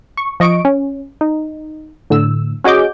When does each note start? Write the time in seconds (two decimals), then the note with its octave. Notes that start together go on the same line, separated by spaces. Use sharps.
0.17 C#6
0.40 F3 D#5 C#6 D7
0.65 C#4
1.21 D#4
2.10 A2 D3 E6
2.64 C#4 F#4 G#4 D#5 D6 G6